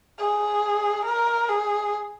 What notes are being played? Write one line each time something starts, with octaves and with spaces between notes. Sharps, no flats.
G#4
A#4
G#4